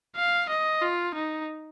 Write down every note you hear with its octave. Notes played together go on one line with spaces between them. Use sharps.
F5
D#5
F4
D#4